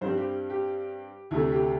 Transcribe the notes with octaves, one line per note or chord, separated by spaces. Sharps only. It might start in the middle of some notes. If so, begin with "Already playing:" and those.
G2 G3 C4 C5
G4
G4
D2 C3 A3 E4
G4